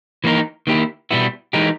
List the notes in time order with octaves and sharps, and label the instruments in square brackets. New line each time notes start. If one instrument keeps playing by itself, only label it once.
[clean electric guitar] E3 A#3 D#4 A#4
D#3 A#3 E4 G4
B2 G3 B3 E4
E3 G#3 D#4 G4 A#4